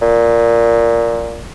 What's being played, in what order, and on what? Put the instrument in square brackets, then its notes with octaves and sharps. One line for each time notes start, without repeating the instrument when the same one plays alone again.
[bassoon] A#2